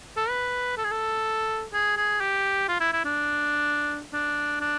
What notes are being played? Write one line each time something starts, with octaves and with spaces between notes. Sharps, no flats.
A4
B4
A4
G#4
A4
G#4
G#4
G4
F4
E4
E4
D4
D4
D4